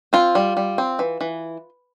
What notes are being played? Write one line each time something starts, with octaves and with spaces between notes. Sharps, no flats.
C4 F4
G3
G3
C4
E3
E3